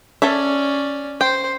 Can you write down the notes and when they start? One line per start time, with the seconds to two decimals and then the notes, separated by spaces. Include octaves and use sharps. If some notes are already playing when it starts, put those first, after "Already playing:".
0.22 C#4 A4 C#5 D5 E5
1.21 C5 G5